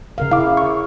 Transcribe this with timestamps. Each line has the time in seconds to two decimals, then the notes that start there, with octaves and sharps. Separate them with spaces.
0.18 C#3 A#4 F5
0.32 E4 F5 D6
0.57 C#6